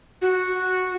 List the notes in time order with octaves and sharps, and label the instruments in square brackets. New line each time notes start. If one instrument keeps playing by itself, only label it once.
[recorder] F#4